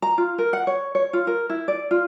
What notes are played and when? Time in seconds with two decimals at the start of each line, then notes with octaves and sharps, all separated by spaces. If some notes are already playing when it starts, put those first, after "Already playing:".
0.02 A#5
0.18 F4
0.38 A#4
0.53 F#5
0.67 C#5
0.95 C#5
1.13 F4
1.27 A#4
1.50 E4
1.68 D5
1.91 F4